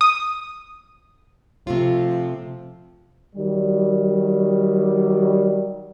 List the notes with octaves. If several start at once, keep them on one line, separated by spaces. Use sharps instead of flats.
D#6
C3 F3 A3 F4
D#3 F#3 G3